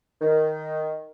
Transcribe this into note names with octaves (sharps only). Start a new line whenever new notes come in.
D#3